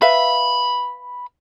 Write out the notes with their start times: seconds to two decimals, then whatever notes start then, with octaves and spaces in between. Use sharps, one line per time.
0.02 B4 E5 F5 B5